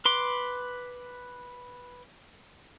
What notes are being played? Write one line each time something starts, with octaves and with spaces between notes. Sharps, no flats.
B4 C6 D6